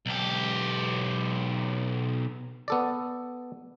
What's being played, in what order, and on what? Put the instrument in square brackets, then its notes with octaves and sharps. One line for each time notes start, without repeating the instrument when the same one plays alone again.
[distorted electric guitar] B1 G4
[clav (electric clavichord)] B3 A4 D5